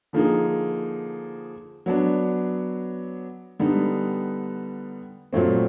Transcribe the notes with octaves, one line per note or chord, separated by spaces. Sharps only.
D3 F3 A#3 D#4 G#4
F#3 B3 D4
D3 G3 B3 D#4
A#2 F#3 A3 C4